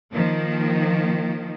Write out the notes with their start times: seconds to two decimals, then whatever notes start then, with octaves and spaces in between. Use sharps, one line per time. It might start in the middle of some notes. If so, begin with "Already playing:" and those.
0.12 D#3 F3 A#3